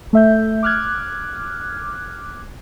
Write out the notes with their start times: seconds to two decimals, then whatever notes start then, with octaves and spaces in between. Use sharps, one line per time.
0.13 A3 E5 G6
0.63 D6 F6 F#6 G#6